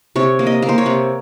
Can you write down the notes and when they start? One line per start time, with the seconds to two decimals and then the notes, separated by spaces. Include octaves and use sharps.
0.16 C3 C#5
0.39 A#3
0.47 D#5
0.62 A#3
0.69 C5
0.78 C#5
0.86 C3